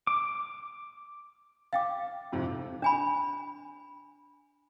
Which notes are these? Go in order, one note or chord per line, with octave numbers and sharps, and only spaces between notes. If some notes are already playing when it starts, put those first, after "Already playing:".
D6
F5 G5 D6 A6
F2 G#2 C3
D4 G#5 B5